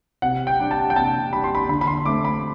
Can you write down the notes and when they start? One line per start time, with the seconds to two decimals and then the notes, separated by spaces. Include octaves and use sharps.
0.22 C3 F#5
0.47 G5
0.59 G3 D4
0.71 A5
0.90 G5
0.96 C3 A5
1.32 G3 D4 B5
1.44 C6
1.55 B5
1.69 D3 B5
1.81 B5
1.87 C6
2.05 A3 C4 D6
2.25 B5